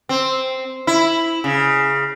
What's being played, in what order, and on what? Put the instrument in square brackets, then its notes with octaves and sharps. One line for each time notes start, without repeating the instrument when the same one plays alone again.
[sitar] C4
E4
C#3